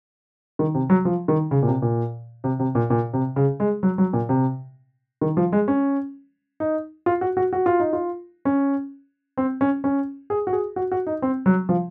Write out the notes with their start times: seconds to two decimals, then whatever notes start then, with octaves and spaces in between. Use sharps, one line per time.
0.59 D#3
0.75 C3
0.90 F#3
1.05 F3
1.28 D#3
1.51 C#3
1.62 A#2
1.67 C3
1.82 A#2
2.44 C3
2.59 C3
2.75 A#2
2.90 A#2
3.13 C3
3.36 C#3
3.60 G#3
3.83 F#3
3.98 F#3
4.13 A#2
4.29 C3
5.21 D#3
5.37 F3
5.52 G#3
5.68 C#4
6.60 D#4
7.06 F4
7.21 F#4
7.37 F#4
7.53 F#4
7.66 F4
7.80 D#4
7.93 F4
8.45 C#4
9.37 C4
9.61 C#4
9.84 C#4
10.30 G#4
10.47 F#4
10.53 G#4
10.76 F#4
10.92 F#4
11.07 D#4
11.22 C4
11.46 F#3
11.69 F3